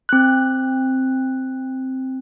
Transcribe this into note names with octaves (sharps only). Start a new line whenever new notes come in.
C4 F#6